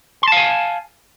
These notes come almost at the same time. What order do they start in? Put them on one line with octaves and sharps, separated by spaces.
C6 A5 F5 G#5